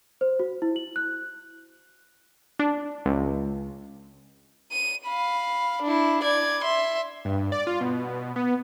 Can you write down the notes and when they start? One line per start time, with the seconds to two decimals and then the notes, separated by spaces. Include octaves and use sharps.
0.21 C5
0.39 F#4
0.62 E4
0.76 F#7
0.96 F#6
2.59 D4
3.06 C#2
4.71 D#7
5.06 F5 B5
5.82 D4 E4
6.23 D5 G#6
6.64 E5 C6
7.25 G2
7.52 D5
7.67 F4
7.81 B2
8.36 B3